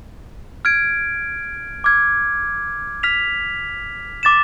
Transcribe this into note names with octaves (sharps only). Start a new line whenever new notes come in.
F6 G#6 D7
D6 F6 G#6
F6 B6 F7
D6 A6 E7